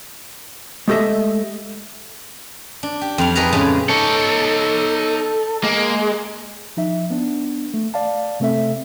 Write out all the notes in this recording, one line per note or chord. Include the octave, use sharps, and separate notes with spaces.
G#3 A3 G4 A4 D#5 E5
D4
G4
F2 G3 F5
F3 D#4 G#4 A#4 B4 A#5
A2 C#3 G#3 A5
D#4 A4 C#5
G#3 A#3
F3 D#4 E5
B3 D4
A3
D5 F5 A5
C3 A3 C4 A4 E5